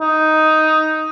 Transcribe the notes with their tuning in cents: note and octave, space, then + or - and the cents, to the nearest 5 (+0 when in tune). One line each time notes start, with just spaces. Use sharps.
D#4 +5